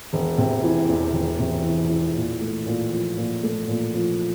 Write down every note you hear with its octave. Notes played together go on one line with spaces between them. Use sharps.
E1
C3
E3
E2
E1
C3
E3
E2
A#2
A3
A#2
F3
A#2
A3
A#2
F3